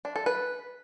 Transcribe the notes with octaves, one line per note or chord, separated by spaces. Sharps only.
D4
A4
B4